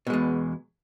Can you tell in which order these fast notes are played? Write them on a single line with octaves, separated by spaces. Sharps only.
B2 G#3 E2